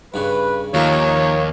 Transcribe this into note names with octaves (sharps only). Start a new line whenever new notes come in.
G2 C#3 B4
D#2 F3 A#3 D#4 C#5 C#6